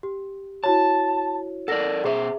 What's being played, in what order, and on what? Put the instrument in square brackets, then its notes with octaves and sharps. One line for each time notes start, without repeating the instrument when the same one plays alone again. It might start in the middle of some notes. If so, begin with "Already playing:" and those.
[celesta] G4
[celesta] E4 F#4 C#5 [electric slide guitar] A5
[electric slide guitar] A4 A#4 D5 [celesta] F#5 A#6
[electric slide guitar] B2 C5 [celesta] G#4 E5